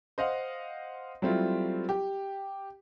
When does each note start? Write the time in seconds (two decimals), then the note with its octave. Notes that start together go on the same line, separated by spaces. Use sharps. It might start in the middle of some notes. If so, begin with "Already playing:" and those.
0.18 C5 D#5 F5 F#5
1.22 F#3 G3 A3 C4 E4 F4
1.89 G4